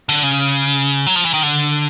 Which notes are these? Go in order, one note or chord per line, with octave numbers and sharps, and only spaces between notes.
D3
C#3
F#3
F3
E3
D#3
D3